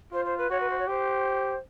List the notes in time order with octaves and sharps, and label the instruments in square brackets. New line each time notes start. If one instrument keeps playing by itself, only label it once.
[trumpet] F4 [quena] C5
[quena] C5
B4
[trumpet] F#4 [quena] C#5
[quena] B4
C5
C#5
[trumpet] G4 [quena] C5